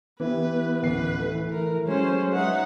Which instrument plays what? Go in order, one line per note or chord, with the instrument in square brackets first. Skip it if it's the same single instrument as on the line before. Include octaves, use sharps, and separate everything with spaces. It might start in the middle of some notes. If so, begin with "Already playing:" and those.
[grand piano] E3 E4 G4 [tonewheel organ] B3 [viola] B4
[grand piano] D1 A1 C7 [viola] B4
[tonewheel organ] E3 [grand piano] A3
[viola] A#4
[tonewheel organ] F#3 G#3 [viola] C#4 C5
[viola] D#4 F#5 [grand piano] B4 E5